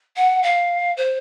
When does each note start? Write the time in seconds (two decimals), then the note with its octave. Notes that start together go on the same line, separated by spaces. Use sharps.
0.16 F#5
0.43 F5
0.97 C5